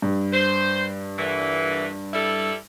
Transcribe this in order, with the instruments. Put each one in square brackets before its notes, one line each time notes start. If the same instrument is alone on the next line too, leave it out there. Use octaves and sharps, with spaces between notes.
[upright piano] G2
[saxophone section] C5
A#2 D3 E3
G3 E4 A4